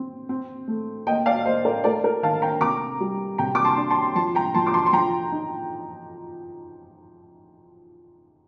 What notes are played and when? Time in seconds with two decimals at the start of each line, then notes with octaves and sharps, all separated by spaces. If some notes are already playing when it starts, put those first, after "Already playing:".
Already playing: C4
0.29 C4
0.68 A3
1.07 A#3 D#5 G5
1.26 D5 F5
1.45 A#3 C5 D#5
1.65 A#4 D5
1.84 A3 A#4 D5
2.04 A#4
2.23 D#3 F5 A5
2.42 G5 A#5
2.61 C3 A#5 D6
3.00 G3
3.38 C3 G5 A#5
3.55 D6
3.64 A5 C6
3.77 D4
3.90 A5 C6
4.16 F3 A5 C6
4.35 G5 A#5
4.54 F3 A5 C6
4.67 D6
4.74 A5 C6
4.86 C6
4.93 F3 G5 A#5
5.32 D#4